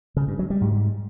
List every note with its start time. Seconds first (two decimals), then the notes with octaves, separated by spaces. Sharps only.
0.17 C#3
0.28 G2
0.39 F#3
0.50 G3
0.61 G#2